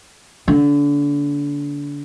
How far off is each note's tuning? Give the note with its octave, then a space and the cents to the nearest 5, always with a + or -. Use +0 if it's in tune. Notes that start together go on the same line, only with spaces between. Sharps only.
D3 -30 A#3 +0